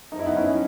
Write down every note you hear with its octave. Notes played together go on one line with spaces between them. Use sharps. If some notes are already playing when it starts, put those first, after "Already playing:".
F#1 D#4
E4
B3 D#4
F#1 C#4 E4